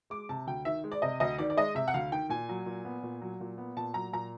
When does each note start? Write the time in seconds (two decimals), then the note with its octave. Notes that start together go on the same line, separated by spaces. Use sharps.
0.10 G#3 D6
0.29 C3 A5
0.47 D2 G5
0.65 D#3 E5
0.84 G#3
0.92 D5
1.02 C3 D#5
1.20 D2 D#5
1.38 D#3 D5
1.50 D5
1.57 G#3 D#5
1.75 C3 E5
1.88 F#5
1.94 D2 F5
2.12 D#3 G5
2.30 A#2 G#5
2.49 F#3
2.66 A#2
2.85 B3
3.03 A#2
3.22 F#3
3.40 A#2
3.58 B3
3.77 A#2 A5
3.94 F#3 A#5
4.13 A#2 A#5